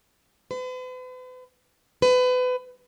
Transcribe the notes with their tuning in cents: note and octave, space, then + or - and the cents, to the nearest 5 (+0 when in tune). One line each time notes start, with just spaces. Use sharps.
B4 +45
B4 +30